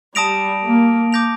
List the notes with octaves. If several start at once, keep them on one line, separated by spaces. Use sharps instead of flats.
G3 A5 D#6 A#6 D7 F7
A#3
D6 G6 A#6 F7